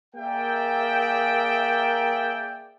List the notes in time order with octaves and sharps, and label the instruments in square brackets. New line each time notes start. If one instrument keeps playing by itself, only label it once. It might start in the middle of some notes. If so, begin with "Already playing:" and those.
[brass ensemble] A#3 G#4 A#4 D5 E5 G5